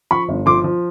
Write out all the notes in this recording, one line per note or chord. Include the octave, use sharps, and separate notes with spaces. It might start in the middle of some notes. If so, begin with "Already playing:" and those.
F3 B5 C#6
G1
F3 C6 D6
F3